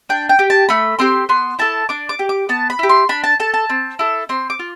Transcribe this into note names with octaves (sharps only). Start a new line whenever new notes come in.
D4 G5
G5
G4
A5
A3 B5
C4 G4 C6
B3 C6
E4 A4 A5
D4 D6
D6
G4
D6
B3 A5
B5
E4 G4
C6
D4 B5
A5
A4 A5
A5
C4
E4 A4
C4 C6
D6
F4